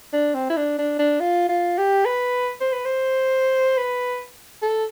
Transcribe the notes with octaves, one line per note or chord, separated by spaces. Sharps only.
D4
C4
E4
D4
D4
D4
F4
F4
G4
B4
C5
B4
C5
B4
A4